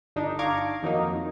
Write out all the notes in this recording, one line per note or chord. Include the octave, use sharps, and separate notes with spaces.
G1 D4 D#4
F5 A#5 C#6 D6 G#6
F2 D#3 F#3 A#3 D#4